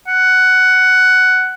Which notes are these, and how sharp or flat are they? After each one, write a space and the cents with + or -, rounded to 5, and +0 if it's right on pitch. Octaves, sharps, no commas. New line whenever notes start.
F#5 +10